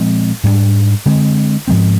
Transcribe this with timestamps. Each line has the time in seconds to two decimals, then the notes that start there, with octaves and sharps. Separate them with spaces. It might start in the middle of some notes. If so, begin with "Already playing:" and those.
Already playing: A#2 F3 G#3 C4
0.44 G#2 G3 A#3 D4
1.06 D3 G#3 C4
1.68 G#2 F3 G#3 C4